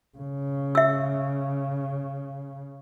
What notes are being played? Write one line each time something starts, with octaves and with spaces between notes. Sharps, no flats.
C#3
E5 E6